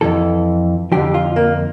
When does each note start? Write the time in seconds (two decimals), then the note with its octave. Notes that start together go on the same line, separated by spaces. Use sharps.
0.01 F2 E3 A4
0.92 F2 D3 F3 G4
1.14 F4
1.36 A#3